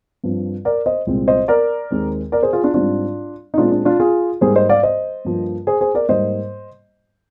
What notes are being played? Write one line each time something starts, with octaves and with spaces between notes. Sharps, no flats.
G2 F3 C4
A#4 D5
C5 D#5
C2 A#2 G#3 C4
C5 D#5
A#4 D5
D#2 D#3 G#3 C4
A#4 D5
G#4 C5
F4 G#4
D4 F4
G#2 G3 C4 D4 F4
D#4
A#2 G#3 C4 D4 F4
D4
D4 F4
F4 G#4
G#2 G3 A#3 G#4 C5
C5 D#5
D5 F5
C5 D#5
G2 F3 A#3
G#4 C5
G#4 C5
A#4 D5
G#2 G3 A#3 C5 D#5